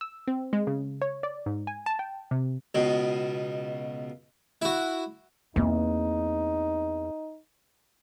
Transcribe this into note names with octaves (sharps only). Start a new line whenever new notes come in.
E6
C4
G#3
C#3
C#5
D5
G#2
G#5
A5
G5
C3
C#2 B2
E4 F#4
E2 A#3 C4 D#4